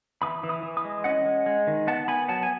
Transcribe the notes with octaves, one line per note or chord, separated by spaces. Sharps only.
E3 B5 D#6
E3
B5 D#6
E3
B5 D#6
G#3
C#4 D#5 F#5
G#3
G#3
D#3
B3 F#5 A5
B3 G#5 B5
F#3 F#5 A5
G#5